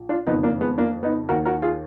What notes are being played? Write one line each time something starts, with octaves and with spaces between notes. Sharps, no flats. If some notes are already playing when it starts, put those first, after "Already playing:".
Already playing: A#1
D4 F4
F#1 F2 D#3 B3 D#4
A#3 D4
G#3 B3
A#3 D4
B3 D#4
D#2 D#3 F#4 A#4
F#4 A#4
F4 G#4